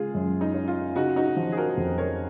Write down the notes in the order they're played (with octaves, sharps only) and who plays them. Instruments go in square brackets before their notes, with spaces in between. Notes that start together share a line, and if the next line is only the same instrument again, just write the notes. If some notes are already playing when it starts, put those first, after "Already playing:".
Already playing: [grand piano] C#3 G#3 [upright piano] F4 G#4
[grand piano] F#2
[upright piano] D#4
[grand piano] C#4
[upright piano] F4
[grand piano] C#3 [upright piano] D#4 F#4
[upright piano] D#4 F#4
[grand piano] F3
[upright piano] G#4
F#4 A#4
[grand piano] F2
[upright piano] A#4 C#5